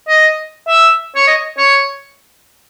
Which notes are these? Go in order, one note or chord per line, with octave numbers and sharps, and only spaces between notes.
D#5
E5
C#5
D#5
C#5